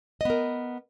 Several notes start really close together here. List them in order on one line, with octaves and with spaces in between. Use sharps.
D#5 B3 A#4